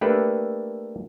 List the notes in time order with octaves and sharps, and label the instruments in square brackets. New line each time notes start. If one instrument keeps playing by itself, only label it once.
[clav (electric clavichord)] A3 A#3 D4 G4 A4 B4